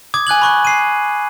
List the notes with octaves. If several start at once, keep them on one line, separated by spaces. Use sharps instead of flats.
D6 D#6 G#6
G#5 F#6 G#6 F#7
B5 C#6 F#6
C7 D#7